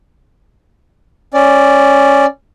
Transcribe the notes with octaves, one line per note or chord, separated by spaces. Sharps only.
C#4 D5